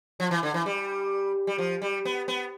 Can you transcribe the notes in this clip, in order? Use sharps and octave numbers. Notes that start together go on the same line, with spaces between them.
F3
E3
D3
E3
G3
G3
F3
G3
B3
B3